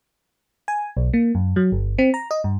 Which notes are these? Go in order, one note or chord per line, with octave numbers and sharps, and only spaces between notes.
G#5
B1
A#3
F#2
F#3
G1
C4
A#5
D#5
G2